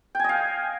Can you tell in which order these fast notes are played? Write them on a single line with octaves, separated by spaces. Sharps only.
G5 G#5 D#5 F5